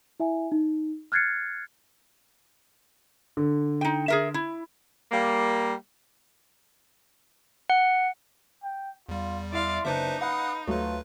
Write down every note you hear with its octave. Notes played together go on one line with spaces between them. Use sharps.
E4 E5 G#5
D#4
F6 F#6 G#6 A6 C7 C#7
D3
D#4 G5
G#4 A#4 E5
E4
G3 A#3
F#5
G5
E2 G3 F4
E4 D5 E5 F5 C6
F#1 D4 D#4 B4 C5 E5 C#7
B4 F5 F#5 D#6 F#6
D2 F#3 A3 F4 B4